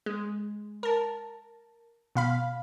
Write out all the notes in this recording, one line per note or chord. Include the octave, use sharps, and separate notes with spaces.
G#3
A#4 A5
B2 F5 B5